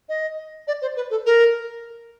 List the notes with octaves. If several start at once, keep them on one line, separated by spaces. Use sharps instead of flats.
D#5
D5
C5
B4
A4
A#4